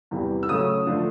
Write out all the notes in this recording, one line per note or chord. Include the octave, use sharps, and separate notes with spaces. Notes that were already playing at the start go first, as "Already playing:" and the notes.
E2 C3 E3 G3
E6
C#3 F#3 A3 C#4 D#6
D3 F3 A3 D4